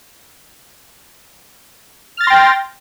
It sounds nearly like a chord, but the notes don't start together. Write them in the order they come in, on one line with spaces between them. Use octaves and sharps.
F6 A6 A#6 C6 G5